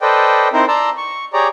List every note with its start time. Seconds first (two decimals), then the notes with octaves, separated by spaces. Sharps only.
0.01 A4 B4 C5 D5 D#5 G5
0.53 C4 D#4 E4 A#4 C5
0.68 D5 A5 A#5 C6 E6
0.97 C#6
1.33 G4 G#4 C#5 D5 A#5